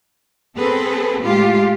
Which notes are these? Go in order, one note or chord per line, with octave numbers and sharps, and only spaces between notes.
B3 C4 G#4 A4 B4
A2 G#3 F4 G4